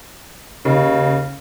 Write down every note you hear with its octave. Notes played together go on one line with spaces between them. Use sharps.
D#2 C#3